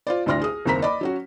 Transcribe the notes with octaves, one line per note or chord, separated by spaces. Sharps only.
F4 C5 D5
A1 D2 D4 C6 F6 A#6
G#4 D#6
F#1 D#2 C4 A#4 A#5 B6
D5 D#5 B5 D6
F#3 C#4 F#4